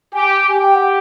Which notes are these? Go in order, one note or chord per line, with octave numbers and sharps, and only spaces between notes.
G4 G#5
G4 G#5
G5
F#5